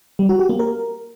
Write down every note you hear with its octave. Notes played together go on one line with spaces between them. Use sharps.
G3
F#4
G4
A#3
A#4